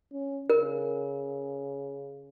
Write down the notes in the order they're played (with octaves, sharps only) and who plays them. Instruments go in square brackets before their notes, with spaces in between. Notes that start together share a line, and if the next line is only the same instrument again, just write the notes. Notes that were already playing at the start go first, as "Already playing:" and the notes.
[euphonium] C#4
[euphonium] C#3 [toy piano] A#4